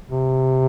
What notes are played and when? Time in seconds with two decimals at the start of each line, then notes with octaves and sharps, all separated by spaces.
0.10 C3